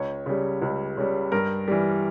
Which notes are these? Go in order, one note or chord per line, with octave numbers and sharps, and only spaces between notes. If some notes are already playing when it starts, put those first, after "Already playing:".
Already playing: C#2 C#5
C#3 G3
C#2
C#3 G3
G2 A#4
E3 G3